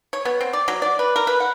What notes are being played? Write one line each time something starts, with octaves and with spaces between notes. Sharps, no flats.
C#5
B3
C4
D5
F#3
D5
B4
A#4
B4
F#5